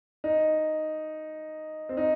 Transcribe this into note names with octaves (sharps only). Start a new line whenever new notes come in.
D#4
C4
D#4